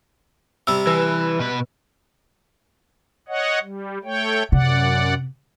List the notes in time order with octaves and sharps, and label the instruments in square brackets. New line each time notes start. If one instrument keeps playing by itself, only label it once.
[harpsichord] C3 G3 [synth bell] E6
[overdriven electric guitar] E3 [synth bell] B4
[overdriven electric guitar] B2 B4
[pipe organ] C#5 D#5 F#5
G3
A3 C#5 G5
[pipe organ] F#2 D5 F#5 [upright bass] C3